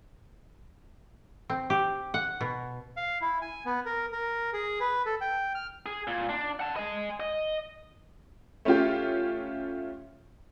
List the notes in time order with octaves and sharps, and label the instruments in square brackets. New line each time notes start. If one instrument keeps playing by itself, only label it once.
[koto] C4
G4
F#5
B2
[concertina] F5
E4
G#5
B3
A#4
A#4
G#4
B4
A4
G5
F6
[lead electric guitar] G#4
A#2
D4
F#5 A5
D#5 G#5
D#5
[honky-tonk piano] A3 C#4 E4 F4 G4